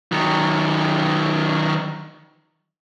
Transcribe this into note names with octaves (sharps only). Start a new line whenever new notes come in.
D#3 F#3